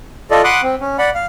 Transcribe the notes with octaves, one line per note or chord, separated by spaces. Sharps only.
F4 A4 D5 D#5
F#5 B5 C6 D6 D#6 F#6
C4
C#4
D5 F#5 B5
F5